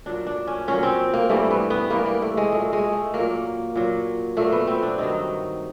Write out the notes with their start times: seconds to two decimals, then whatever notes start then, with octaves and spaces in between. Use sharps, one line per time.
0.06 A#2 F#3 D4
0.27 D4
0.47 C#4
0.68 A#2 F#3 C#4
0.83 C4
1.14 A#3
1.30 G2 E3 G3 A3
1.51 B3
1.70 B3
1.90 G2 E3 G3 A#3
2.06 A#3
2.22 A3
2.37 G#3
2.52 A#2 F#3 A3
2.73 G#3
2.93 A3
3.13 A#2 F#3 A#3
3.76 A#2 F#3
4.37 A#2 F#3 A3
4.52 B3
4.67 C4
4.83 D4
4.98 G2 D#3 F#3 D#4